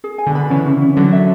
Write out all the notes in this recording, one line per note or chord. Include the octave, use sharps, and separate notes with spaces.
G#4
G#5
B2 D3
B5
C#3 E3 C#4
C#4
C#4
D3 F#3 F#4
E5